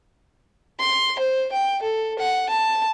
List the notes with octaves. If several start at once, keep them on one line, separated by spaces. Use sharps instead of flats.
C6
C5
G5
A4
F#5
A5